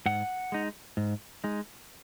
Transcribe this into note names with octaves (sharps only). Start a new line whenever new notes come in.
G#2 F#5
G#3 D#4
G#2
G#3 D#4